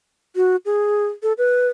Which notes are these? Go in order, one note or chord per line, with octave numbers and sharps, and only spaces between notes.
F#4
G#4
A4
B4